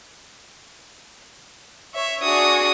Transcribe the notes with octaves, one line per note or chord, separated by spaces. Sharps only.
C#5 E5
D4 F#4 G#4 D#6